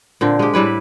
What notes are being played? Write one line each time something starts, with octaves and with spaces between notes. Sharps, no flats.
A#2 D3 C4
G#3 G4
A2 G3 E4 B4